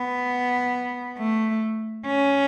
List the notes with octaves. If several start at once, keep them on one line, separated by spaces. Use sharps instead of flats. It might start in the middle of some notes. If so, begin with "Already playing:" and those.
Already playing: B3
A3
C#4